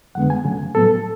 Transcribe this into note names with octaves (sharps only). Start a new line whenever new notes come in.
F2 D3 G#3 B3 F#5
G#5
F#2 C#3 F#3 A3
A2 F#3 B3 A4